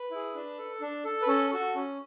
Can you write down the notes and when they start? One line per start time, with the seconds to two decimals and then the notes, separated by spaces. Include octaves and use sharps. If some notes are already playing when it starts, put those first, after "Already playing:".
Already playing: B4
0.11 E4 G#4
0.35 D4
0.58 A4
0.81 D4
1.05 A4
1.22 B4
1.27 C#4 A4
1.51 F#4 A4
1.75 C#4